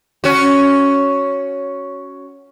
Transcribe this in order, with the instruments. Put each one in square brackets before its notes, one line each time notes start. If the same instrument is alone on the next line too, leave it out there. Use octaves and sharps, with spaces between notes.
[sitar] C#4 F#4